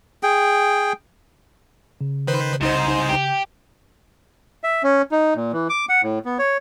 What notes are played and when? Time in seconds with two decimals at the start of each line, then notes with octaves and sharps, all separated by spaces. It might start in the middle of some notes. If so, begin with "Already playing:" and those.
0.23 G#4 G5
2.01 C#3
2.27 D#3 B4 C5
2.61 C2 G#2 D#4 C5
3.09 G4
4.64 E5
4.83 C#4
5.12 D#4
5.36 A#2
5.52 E3
5.69 D6
5.89 F#5
6.03 A2
6.25 B3
6.39 C#5